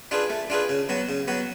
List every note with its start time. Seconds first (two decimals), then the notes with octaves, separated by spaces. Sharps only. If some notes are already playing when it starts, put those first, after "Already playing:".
0.11 D4 F4 G#4 B4
0.30 A3
0.50 D4 F4 G#4 B4
0.69 C#3
0.89 F#3 B3 F#4
1.09 C#3
1.28 F#3 B3 F#4